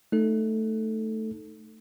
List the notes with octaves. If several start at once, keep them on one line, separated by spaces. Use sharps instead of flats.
A3 D#4 A4